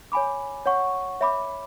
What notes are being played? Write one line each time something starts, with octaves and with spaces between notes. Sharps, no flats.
C#5 G#5 B5 D6
C#5 F#5 C#6
C#5 E5 B5 D6